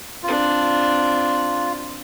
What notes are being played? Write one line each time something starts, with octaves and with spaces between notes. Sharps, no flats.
C4 D4 F4